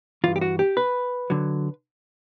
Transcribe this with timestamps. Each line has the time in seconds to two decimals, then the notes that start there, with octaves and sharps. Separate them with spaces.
0.24 G2 E3 F4
0.36 G4
0.41 F#4
0.59 G4
0.77 B4
1.30 D3 F#3